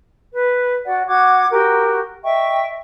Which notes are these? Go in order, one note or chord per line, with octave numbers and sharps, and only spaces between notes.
B4
F#4 D5 F#5
F#4 F#5 D6 G#6
F#4 G4 A#4
D#5 E5 G5 C#6